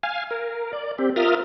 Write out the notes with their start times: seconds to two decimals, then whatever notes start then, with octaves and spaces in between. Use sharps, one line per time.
0.03 F5 G#5
0.31 A#4
0.73 D5
0.98 C4 G4
1.16 F4 A#4 E5 D#6 F6